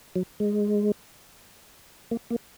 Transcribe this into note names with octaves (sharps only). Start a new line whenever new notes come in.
F#3
G#3
A#3
A#3